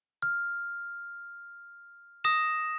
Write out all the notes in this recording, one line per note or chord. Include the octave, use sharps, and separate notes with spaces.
F6
D#6 A#6 E7